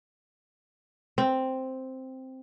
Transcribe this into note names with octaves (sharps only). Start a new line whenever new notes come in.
C4